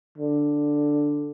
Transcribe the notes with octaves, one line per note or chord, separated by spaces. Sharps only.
D3